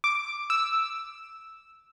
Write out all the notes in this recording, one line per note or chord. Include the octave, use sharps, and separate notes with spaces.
D6
E6